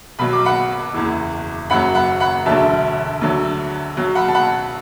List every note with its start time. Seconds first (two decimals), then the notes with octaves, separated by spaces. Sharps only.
0.19 B1 B2 F#3 B5
0.33 D6
0.45 F#5 B5
0.94 F#1 E2 E3
1.70 F#1 F#2 F#3 F#5 B5
1.95 F#5 B5
2.20 F#5 B5
2.46 E1 D2 D3 F#3 E5 A5
3.21 D2 D3 F#3
3.96 B1 B2 F#3
4.15 F#5 B5
4.28 A5
4.34 F#5 B5